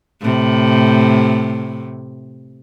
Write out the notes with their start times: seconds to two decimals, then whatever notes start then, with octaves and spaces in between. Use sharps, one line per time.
0.21 A2 C3